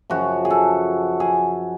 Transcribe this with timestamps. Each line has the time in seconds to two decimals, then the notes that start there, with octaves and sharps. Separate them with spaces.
0.10 F#2 C#3 F3 F#4
0.45 G#4
0.50 A4
1.20 G#4